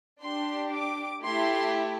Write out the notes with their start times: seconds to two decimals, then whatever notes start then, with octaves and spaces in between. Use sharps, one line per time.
0.23 D4 G4 C6
0.73 D6
1.24 A3 E4 G4 C6